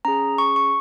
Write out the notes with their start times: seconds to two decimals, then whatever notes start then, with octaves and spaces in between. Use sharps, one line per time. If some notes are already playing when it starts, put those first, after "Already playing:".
0.05 C#4 G#4 A#5
0.38 C#6
0.56 C#6